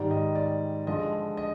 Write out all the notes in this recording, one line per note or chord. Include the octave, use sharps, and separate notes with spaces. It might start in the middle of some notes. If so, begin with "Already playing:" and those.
Already playing: G#2 D#3 G3 D5
D#5
D5
G2 D3 F3 G#3 D#5
D#5